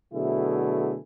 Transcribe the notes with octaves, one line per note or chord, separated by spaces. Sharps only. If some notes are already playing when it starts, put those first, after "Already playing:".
B2 D3 F#3 A3 E4 G#4